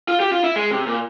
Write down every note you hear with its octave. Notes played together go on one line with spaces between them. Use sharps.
F4
G4
F4
E4
G#3
C3
A#2